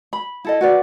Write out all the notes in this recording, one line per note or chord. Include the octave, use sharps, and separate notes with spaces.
B5
E4 A4 D#5
F#4 B4 D5